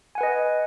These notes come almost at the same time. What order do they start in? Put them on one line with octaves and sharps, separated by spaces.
G#5 F#5 B4 D#5